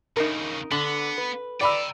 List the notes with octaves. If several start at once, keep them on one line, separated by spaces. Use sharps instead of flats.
D#2 C#3 D#4 A#4
D3 B3 F#7
B4
D5 G5 A#5 B5 E6